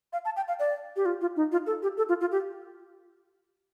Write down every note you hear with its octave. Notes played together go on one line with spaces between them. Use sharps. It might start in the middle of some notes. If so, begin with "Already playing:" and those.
F5
A5
G5
F5
D5
G4
F4
F4
D#4
F4
A4
G4
A4
F4
F4
G4